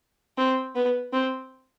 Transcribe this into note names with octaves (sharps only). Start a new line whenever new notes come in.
C4
B3
C4